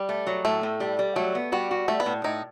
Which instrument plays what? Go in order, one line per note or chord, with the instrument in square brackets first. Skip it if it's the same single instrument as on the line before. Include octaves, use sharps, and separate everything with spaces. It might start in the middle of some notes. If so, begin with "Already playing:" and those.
Already playing: [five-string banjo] G3
[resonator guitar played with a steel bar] A3
F#3
[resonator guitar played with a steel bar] A2 [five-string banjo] A3
[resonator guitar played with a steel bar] A2
G3
G3
[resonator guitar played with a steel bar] F#3 [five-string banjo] A3
[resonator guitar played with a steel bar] B3
[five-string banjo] G3 [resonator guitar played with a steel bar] F#4
[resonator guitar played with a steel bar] F#4
[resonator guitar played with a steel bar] G3 [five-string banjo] A3
[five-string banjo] B3
[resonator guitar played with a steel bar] A2
[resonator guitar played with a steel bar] A2 [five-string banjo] D#4